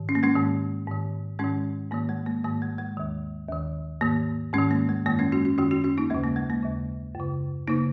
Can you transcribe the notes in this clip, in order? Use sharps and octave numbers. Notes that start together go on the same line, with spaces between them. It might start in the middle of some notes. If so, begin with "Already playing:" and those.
Already playing: G#2 D#3
C#4
A#3
G#3 C#4
G#2 D#3
G#2 D#3
G#2 D#3 G#3 C#4
G#2 D#3 A#3
G#3
A#3
G#2 D#3 A#3
G#3
G#3
D#2 D#3
D#2 D#3
G#2 D#3 A#3
G#2 D#3 G#3 C#4
A#3
G#3
F#2 D#3 A#3
G#3 C#4
C#4 F#4
C#4 F#4
F#2 D#3 C#4 F#4
C#4 F#4
C#4 F#4
A#3 D#4
D#2 C#3 G#3 C#4
A#3
G#3
A#3
D#2 C#3
F#2 C#3
C#3 A#3 D#4